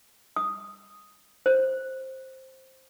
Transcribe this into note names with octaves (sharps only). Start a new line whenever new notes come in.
D#6
C5